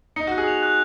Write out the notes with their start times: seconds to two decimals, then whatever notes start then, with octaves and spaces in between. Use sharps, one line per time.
0.16 D#4 C#7
0.27 F#4 F#6
0.38 G#4
0.48 F7
0.63 F#6